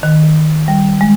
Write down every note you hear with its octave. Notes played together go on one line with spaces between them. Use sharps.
D#3
G3
G#3